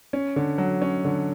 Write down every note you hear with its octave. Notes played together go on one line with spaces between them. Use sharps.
C#4
D3
F#3
C#4
D3